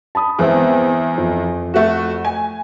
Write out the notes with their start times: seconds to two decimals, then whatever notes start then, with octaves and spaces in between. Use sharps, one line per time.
0.15 A5 B5 D#6
0.39 E2 G#3 B3 C4 E4
1.18 F2
1.74 A3 F#4
2.25 G#5